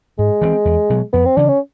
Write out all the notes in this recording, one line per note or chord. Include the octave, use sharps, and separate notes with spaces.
G#2 G#3
E3 A3 C4
E2
B2 F#3
F2 B3
C4
C#3 E3 D4
C#4